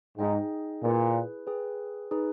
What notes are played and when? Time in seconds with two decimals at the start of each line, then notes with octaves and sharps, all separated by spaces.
0.18 G#2 D#4 G#4 D#5 G5
0.82 A#2 E4 G#4 B4
1.47 G#4 B4 G5
2.11 D#4 G#4 B4